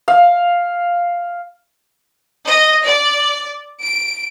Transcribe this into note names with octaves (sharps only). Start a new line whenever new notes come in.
F5
D#5
D5
D7